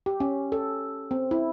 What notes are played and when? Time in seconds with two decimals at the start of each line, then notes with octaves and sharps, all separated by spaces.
0.06 G4
0.20 C#4
0.52 A4
1.11 C4
1.31 E4